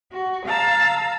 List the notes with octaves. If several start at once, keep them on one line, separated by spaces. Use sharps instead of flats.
F#4
F5 A5 A#5 E6